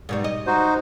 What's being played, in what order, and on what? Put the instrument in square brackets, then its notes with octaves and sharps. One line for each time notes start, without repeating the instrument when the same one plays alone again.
[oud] G#2 B2 G3
D#5
[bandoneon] D#4 F#4 C5